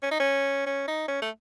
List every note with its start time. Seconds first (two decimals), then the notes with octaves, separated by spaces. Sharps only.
0.03 C#4
0.11 D#4
0.20 C#4
0.66 C#4
0.88 D#4
1.08 C#4
1.22 A3